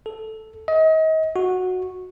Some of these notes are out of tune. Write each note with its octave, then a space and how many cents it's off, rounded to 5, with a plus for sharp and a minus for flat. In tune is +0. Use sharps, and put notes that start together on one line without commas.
A4 -5
D#5 +35
F#4 -10